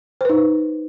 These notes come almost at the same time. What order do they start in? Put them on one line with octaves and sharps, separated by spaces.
C5 B4 D#4